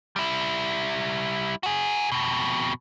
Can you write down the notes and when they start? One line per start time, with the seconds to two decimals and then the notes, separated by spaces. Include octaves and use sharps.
0.16 G3 E4
1.63 F#4 G#4
2.12 F2 B2